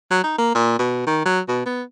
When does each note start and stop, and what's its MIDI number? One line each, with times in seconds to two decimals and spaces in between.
0.11 0.21 54
0.23 0.34 63
0.38 0.54 58
0.54 0.76 46
0.79 1.02 47
1.07 1.20 51
1.25 1.40 54
1.48 1.62 47
1.66 1.82 59